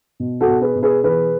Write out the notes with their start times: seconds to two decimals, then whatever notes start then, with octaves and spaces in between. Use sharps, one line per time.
0.20 B2
0.41 F#4 A4
0.48 B2
0.61 G#4 B4
0.75 B2
0.82 G#4 B4
1.04 E3 G#4 B4